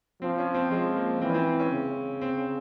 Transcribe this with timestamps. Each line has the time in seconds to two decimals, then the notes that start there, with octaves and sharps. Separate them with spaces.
0.22 F3 C4
0.38 C#4
0.54 C4
0.71 F3 G#3
0.96 A#3
1.21 E3 C4
1.29 C#4
1.34 C4
1.46 C4
1.60 C#4
1.71 C#3
2.21 C4